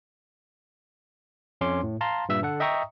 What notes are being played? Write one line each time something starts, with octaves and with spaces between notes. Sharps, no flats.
F2 C#4 C6 D6
A2
F5 A5 A#5 C6
G2 A#2 E5 E6
D3 A4 F#5
D#5 E5 G5 A#5 C#6 D#6